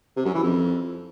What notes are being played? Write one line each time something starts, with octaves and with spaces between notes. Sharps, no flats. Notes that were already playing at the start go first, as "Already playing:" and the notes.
C3
F#2
E3
F2